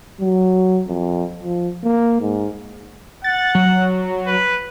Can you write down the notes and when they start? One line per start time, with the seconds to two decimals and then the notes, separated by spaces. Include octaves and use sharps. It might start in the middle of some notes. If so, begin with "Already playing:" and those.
0.20 F#3
0.87 F2
1.43 F3
1.83 A#3
2.21 G#2
3.24 F#5 A6
3.55 F#3
4.27 B4